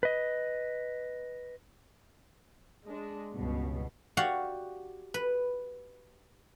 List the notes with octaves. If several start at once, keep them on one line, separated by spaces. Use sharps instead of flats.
B4 D#5
G#3 D4
C#2 G2 B2
F#4 G4 D5 F5 F#5
B4